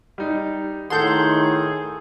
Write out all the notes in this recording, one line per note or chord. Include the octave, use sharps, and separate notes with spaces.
G3 D#4
A2 D#3 G#4 A4 F#5 C6 G6